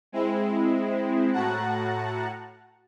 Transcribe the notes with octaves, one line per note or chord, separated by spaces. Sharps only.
G#3 C4 E4
A2 F#4 F#5 A5 A#5 F#6